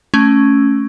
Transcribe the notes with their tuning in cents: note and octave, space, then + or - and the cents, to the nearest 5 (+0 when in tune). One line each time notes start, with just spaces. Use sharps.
A3 +0 C#4 +0